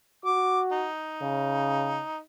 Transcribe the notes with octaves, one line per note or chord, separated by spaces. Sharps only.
F#4 D6
D#4
C#3